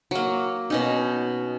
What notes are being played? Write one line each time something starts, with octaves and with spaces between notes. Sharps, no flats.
F#3 A#3
B2 C#4 D#4